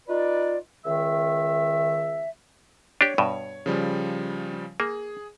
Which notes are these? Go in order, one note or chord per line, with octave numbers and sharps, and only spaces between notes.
D#4 F4 B4 D5
C#2 D#3 E5
D4 G4 C#5
G2 B2
C#3 F3 G3
A#3 G#4